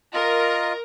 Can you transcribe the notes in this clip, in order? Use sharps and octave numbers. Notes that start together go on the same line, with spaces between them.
F4 A#4 D#5